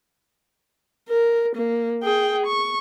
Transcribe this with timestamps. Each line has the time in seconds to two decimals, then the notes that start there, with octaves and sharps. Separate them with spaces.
1.08 A#4
1.55 A#3
2.03 G#4 G5
2.46 C#6